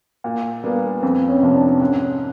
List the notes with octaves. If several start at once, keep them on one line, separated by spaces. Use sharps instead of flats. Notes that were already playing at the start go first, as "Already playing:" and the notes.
A#2 A#3
G3 A#3 B3 D4
F2 C4
C#4
C3 F3 A#3
D4
G#2 C#4